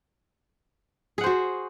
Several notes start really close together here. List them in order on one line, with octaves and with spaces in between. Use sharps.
G#4 F#5 C5 F#4